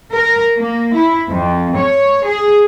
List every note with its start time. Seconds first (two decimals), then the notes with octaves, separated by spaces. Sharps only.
0.13 A#4
0.56 A#3
0.94 E4
1.29 F2
1.76 C#5
2.26 G#4